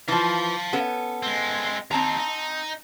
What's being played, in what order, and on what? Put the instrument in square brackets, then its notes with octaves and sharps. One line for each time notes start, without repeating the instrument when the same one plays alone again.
[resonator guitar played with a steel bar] E3 F3 [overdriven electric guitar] F5 A5
[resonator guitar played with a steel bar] B3 C#4 A4
[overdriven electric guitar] G#3 C4
[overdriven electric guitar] D#2 D#4 [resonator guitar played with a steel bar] C4 A5 A#5
[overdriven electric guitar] D#4